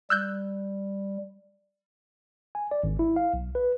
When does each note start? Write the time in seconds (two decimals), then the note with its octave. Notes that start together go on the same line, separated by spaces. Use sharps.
0.10 G3 E6 F#6 G6
2.55 G#5
2.71 D5
2.84 G#1
2.99 E4
3.16 F5
3.34 B1
3.55 B4